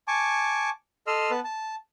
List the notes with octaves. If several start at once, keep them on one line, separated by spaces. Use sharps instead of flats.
G#5 A5 C#6 D6
A4 D#5 C6 E6 F6
B3 B4 A5
A5